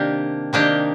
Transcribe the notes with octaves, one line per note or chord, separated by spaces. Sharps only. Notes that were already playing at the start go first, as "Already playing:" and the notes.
Already playing: C3 D#3 A#3 D4 G4
C3 D#3 A#3 D4 G4